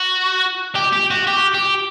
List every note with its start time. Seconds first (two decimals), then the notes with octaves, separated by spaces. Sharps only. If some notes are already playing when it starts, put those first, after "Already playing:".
Already playing: F#4
0.75 G4
0.93 G4
1.11 F#4
1.27 G4
1.54 G4